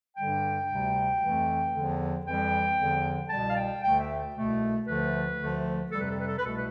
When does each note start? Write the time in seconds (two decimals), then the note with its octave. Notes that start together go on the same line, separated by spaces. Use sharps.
0.17 G2 D3 G3 G5
0.69 D2 C3 G3
1.22 F2 E3 A3
1.73 E2 D3 F3
2.25 F2 E3 G3 G5
2.77 E2 D3 F3
3.30 C2 B2 G3 A5
3.47 F5
3.56 G5
3.82 D2 D3 A3 G5
4.00 E5
4.35 C2 B2 A3
4.87 D2 D3 F3 A3 B4
5.39 D2 D3 F3 A3
5.92 F2 C3 G3 A4
6.00 B4
6.10 A4
6.19 B4
6.27 A4
6.37 B4
6.44 C2 B2 A3 A4
6.55 B4